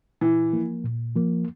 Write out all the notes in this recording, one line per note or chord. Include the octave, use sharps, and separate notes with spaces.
A#2 E3
F3 A#3
A#2
F3 A#3